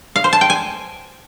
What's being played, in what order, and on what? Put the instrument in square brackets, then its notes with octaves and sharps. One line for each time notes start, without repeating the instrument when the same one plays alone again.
[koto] F5
C5
A5
G5
G#5